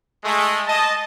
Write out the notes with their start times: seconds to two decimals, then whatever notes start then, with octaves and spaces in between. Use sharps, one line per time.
0.24 G#3 A3
0.67 D#5 A5